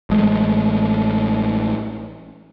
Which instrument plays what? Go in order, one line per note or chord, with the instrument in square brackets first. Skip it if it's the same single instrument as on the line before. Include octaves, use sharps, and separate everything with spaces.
[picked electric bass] A1 G#3 A3